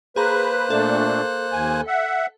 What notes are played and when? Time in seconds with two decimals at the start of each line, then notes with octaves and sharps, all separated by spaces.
0.16 A#3 G#4 B4 C5 A#5 F#6
0.70 A#2 A3 D4 A4
1.52 D#2 G#5
1.87 E5 F#5